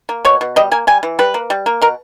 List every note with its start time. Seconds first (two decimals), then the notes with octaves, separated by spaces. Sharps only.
0.09 A#3
0.25 B2 C#5
0.41 B2
0.56 G3 D#5
0.71 A#3 G#5
0.87 G3 G#5
1.03 E3
1.19 G3 B4
1.34 A#3
1.50 G3
1.66 A#3
1.81 B2 A#4